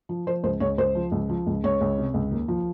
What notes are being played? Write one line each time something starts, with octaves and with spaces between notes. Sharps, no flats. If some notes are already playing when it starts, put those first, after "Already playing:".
F3
F3 C5
C#2 C5
C#2 C#5
C#2 C5
F3
C#2
F3
C#2
C#2 C#5
C#2
C3
C#2
D#2
F3